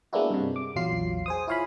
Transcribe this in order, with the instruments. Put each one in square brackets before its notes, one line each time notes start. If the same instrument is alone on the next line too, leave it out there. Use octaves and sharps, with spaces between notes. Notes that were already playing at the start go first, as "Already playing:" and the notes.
[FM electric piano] G#3 A#3 B3 D4 E4 F#4
G2 C3
D6
A#1 E2 F#3 F4 C7
G#4 C5 D#6
E4 F4 C#5 F5 G#5 B5